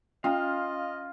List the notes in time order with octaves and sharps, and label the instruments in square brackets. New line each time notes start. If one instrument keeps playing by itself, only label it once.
[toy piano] C#4 [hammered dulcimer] F4 [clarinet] D#5 [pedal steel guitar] F5 A#5